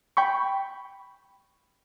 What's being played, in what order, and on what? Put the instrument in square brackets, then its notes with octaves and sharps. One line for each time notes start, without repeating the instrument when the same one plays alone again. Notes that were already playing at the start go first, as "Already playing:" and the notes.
[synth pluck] G5 B5 C#6